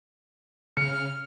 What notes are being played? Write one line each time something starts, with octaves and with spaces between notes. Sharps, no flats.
C#3 F6 C#7